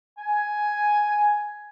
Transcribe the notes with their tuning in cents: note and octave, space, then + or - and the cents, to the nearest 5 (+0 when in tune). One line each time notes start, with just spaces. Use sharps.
G#5 +5